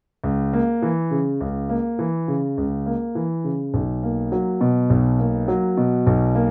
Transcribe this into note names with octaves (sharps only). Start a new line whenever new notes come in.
C#2
A#3
E3
C#3
C#2
A#3
E3
C#3
C#2
A#3
E3
C#3
B1
A#3
F#3
B2
B1
A#3
F#3
B2
B1
A#3